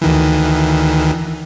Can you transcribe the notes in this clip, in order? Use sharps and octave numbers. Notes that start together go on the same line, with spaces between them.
D2 D#3 E3